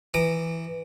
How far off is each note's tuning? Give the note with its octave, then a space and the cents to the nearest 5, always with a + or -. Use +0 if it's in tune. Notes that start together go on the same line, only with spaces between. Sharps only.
E3 +0 A#5 +0 D6 +45